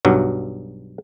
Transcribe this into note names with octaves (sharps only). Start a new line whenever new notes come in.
B1 G2 F#3